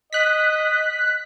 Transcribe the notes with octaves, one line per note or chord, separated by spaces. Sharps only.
D#5 F#6 B6